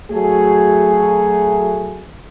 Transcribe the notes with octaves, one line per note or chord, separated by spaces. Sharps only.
F#3 A3 G#4